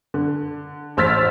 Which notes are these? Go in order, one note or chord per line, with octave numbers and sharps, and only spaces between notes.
D3
A1 C5 E6 F6 A6 B6